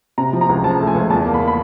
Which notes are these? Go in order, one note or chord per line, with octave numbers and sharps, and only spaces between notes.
C3 A#5
F3
A#5
C#2
F3 A5
A3
G#5
C#2
E2 A5
A#3
B5
B5